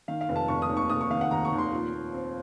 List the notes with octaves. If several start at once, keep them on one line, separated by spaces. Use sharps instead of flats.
D#3 F5
F5
F1
A5
F1 C#6
D#6
D#2
C#6
F1 D#6
C#6
D#3 F5
F#5
D#2 A#5
C#6
D#2
C6
A#2
A#2
C4